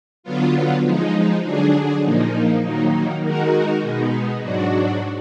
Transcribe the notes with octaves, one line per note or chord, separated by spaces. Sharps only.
D3 F#3 B3 F4
F3 G#3 D#4
D3 F#3 D4 G#4
A#2 F3 A#3 D#4
D#3 F#3 A#3 D#4
D#3 G#3 D#4 F#4 A#4
B2 G#3 B3 D#4
G#2 F#3 D4 F#4